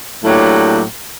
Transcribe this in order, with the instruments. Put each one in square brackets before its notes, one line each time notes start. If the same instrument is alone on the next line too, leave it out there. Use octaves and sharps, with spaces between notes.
[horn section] A2 F#3 A#3 D4 G4